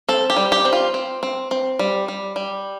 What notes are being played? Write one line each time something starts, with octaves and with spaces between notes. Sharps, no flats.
C4 A4
G4
G3
G4
C4
F4
C4
C4
C4
G3
G3
G3